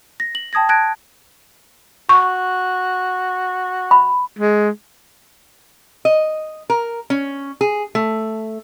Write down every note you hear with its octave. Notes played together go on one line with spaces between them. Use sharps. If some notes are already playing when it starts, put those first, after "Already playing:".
A#6
F#7
G5 A5 D#6 G#6 A#6
A5 F#6 G#6 A#6 D7
F#4 C#6
B5
G#3
D#5
A#4
C#4
G#4
A3